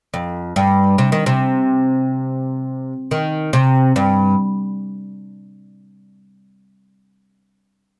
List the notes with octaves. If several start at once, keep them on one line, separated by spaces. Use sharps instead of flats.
F2
G2
C3
D#3
C3
D#3
C3
G2